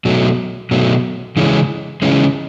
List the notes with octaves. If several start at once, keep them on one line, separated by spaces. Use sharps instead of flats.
B2 F#3 A3
B2 F#3 A3
C#3 E3 G#3 C#4
C#3 E3 G#3 C#4